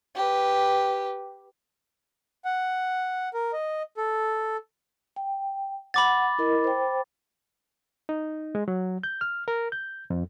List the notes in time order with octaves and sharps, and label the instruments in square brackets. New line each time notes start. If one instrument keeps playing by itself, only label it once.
[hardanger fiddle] G4 B4
[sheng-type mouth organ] F#5
A#4
D#5
A4
[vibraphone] G5
[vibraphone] F#5 [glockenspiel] B5 D6 A6
[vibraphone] E4 A#4 D#5
C5 G5
[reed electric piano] D#4
G#3
F#3
G6
F6
A#4
G6
F2